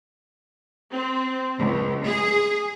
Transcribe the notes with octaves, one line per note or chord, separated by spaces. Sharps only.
C4
C#2
G#4